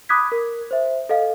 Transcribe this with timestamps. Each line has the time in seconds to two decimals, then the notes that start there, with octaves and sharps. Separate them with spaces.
0.09 B5 D6 D#6 F#6 G#6 B6
0.32 A#4
0.71 C5 E5
1.09 A4 D#5 F5